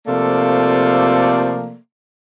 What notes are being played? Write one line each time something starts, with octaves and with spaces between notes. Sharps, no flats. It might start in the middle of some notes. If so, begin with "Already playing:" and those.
C3 F3 A3 A#3 A4 D5